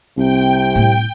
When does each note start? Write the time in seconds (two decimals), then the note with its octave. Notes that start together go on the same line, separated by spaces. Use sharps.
0.18 C2 C3 G5
0.75 A2 C4